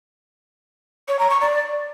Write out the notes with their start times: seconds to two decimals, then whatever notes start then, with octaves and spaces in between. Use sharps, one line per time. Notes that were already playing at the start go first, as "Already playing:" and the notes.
1.08 C#5
1.19 A#5
1.30 C#6
1.41 D5